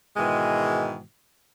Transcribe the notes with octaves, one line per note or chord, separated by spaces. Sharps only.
G#2 B2 D#3 E3 G#3